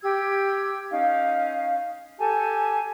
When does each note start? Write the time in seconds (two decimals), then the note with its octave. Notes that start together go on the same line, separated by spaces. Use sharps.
0.02 G4 E6 G#6
0.89 C#4 D#4 F5
2.18 G4 A4 G#5 A5